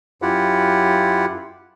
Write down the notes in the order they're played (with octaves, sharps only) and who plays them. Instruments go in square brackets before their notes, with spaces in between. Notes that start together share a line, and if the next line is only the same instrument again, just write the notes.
[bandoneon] F#2 E4 F4 G4 F#5